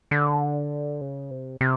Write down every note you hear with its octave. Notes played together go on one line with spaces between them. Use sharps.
D3
C#3
C3
C3